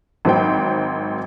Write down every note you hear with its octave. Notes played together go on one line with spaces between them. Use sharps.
G#1 F#3 C5 G5